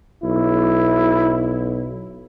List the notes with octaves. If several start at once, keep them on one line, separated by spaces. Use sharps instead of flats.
B1 E4